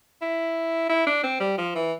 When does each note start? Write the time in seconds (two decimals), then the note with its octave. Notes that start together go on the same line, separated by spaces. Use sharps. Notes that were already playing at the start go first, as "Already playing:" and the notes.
0.22 E4
0.89 E4
1.07 D4
1.23 C4
1.40 G3
1.57 F3
1.75 E3